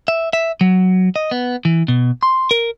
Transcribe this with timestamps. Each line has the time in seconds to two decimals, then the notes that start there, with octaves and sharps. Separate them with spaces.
0.08 E5
0.33 E5
0.61 F#3
1.16 D#5
1.31 B3
1.65 E3
1.88 B2
2.23 C6
2.51 A#4